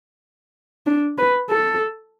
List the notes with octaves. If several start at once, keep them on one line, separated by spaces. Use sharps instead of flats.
D4
B4
A4